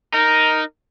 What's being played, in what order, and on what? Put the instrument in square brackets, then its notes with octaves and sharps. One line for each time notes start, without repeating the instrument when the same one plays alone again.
[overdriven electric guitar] D#4 [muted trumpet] A#4